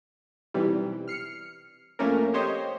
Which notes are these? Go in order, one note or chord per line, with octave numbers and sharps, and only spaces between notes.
B1 C3 E3 G3
F6 C7 C#7
F2 A3 A#3 C#4 A#4
G4 C5 C#5 D#5